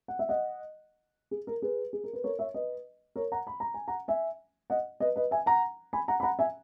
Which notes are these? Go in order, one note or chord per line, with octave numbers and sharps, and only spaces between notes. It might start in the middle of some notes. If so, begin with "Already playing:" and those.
F#5
E5
D#5 F#5
G#4
A#4
G#4 B4
G#4
A#4
B4
A#4 C#5
C#5 E5
B4 D#5
A#4 C#5
F#5 A#5
B5
A#5
G#5
F#5 A#5
E5 G#5
D#5 F#5
B4 D#5
B4 D#5
E5 G#5
F#5 A#5
G#5 B5
F#5 A#5
B5
F#5 A#5
E5 G#5